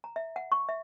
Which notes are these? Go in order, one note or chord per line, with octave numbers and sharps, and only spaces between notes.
A#5
E5
F#5
C#6
E5